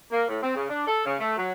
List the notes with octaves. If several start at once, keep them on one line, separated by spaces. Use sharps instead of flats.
A#3
A2
C4
C#3
D4
A4
C#3
A3
F#3